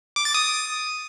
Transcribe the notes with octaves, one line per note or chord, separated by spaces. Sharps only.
D6
A6
D#6